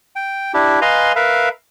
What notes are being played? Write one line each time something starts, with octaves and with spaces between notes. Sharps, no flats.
G5
D4 E4 G4
B4 D#5 F5 G#5 A#5 C6
A#4 B4 E5 F5